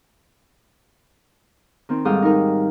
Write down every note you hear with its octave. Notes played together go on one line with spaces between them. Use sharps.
D#3 C4
G#2 G3 A4 F5 G5 D#6
D#4 A#4